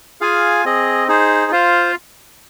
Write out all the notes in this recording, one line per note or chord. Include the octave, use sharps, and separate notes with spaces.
F4 G#4 F5 G#5
C4 G#4 D#5
D#4 G#4 C5
F4 C5 F5